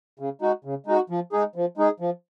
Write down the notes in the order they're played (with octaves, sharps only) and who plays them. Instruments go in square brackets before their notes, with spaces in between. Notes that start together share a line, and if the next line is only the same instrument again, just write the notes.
[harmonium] C#3
G#3 D#4 F#4
C#3
G#3 D#4 F#4
F3
G#3 D#4 G#4
F3
G#3 D#4 G#4
F3